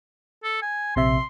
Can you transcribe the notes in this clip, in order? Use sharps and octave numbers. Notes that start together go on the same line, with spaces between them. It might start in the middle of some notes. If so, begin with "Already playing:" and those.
A4
G#5
A#1 C3 E5 C6